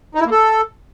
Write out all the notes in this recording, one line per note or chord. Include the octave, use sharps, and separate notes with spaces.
D#4
E4
A#3
A4